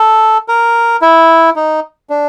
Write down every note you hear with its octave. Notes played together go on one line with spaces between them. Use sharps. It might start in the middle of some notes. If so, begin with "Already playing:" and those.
Already playing: A4
A#4
E4
D#4
D4